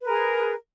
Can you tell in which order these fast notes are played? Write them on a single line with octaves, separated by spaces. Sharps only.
B4 A#4 G#4